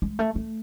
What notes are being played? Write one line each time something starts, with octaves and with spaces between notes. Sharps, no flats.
G#3
A3
A3